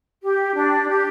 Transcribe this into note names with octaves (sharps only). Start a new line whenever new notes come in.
G4
D4
G4